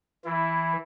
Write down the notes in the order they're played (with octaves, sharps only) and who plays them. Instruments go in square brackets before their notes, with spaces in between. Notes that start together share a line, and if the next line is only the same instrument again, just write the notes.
[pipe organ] E3 [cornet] E4